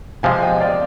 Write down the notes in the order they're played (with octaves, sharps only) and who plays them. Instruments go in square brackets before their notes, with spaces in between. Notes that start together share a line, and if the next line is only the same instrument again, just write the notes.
[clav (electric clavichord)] C3 F3 G#3 [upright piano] F5 G#5
[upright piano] D#5 G5
D5 F5